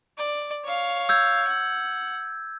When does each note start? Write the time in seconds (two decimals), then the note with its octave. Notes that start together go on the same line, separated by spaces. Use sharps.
0.17 D5
0.64 C#5 F5
1.09 E6 G6 G#6
1.47 F#5